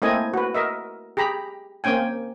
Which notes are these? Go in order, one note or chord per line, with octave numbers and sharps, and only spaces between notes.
A3 A#3 C4 E4 D#5 G#5
F#4 B4
A#4 D#5 E5
G4 G#4 A#5 B5
A#3 C4 C#4 G5 G#5